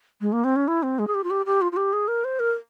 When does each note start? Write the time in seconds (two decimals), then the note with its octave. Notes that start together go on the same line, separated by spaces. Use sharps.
0.21 G#3
0.33 A#3
0.44 C4
0.56 C#4
0.68 E4
0.83 C4
0.99 G#3
1.07 G#4
1.14 G4
1.24 F4
1.30 G4
1.46 G4
1.61 F4
1.72 F4
1.77 G4
1.93 G#4
2.08 A#4
2.24 C5
2.40 A#4